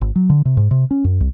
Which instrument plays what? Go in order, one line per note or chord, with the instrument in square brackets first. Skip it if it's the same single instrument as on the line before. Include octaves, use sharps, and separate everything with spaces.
[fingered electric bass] G#1
F#3
D3
C3
G#2
C3
C#4
F#2
C2